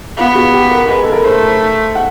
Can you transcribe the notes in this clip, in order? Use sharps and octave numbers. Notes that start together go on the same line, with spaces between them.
B3 F4
F#4
G4
A#4
G#3 B4
A4
A#4
A3 C5
F#5